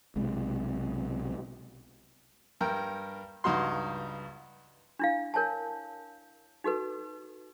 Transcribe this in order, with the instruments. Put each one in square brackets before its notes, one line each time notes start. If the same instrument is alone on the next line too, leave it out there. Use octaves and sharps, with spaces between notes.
[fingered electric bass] B1 C3 G#3
[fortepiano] G2 A#4 G5
C#2 G2 D#4 F#4 C6
[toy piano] D4 E4 F5
A#4 C#5 G#5 A5
D#4 F#4 A4 B4